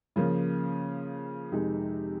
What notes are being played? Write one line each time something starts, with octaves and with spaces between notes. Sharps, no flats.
C#3 F3 A#3
F2 C3 D#3 G#3 D#4